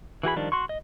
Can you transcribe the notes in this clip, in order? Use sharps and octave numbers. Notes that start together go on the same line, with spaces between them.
E3 F#4 G#4 B5
D#3 F3 G3 D4
F#4 C6 C#6
D#5